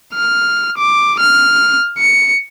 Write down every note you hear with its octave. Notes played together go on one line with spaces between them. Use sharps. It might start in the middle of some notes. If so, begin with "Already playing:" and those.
F6
D6
F6
C#7